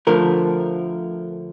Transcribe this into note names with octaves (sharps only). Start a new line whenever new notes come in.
D2 D3 F3 A3 A#4